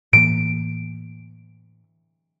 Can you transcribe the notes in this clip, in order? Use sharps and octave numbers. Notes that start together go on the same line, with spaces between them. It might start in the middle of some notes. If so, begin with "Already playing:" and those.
A2 E3 A#3 D7